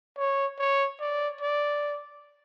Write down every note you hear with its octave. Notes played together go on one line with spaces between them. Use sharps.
C#5
C#5
D5
D5